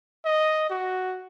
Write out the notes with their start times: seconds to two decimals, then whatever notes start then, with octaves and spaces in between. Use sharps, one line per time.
0.25 D#5
0.70 F#4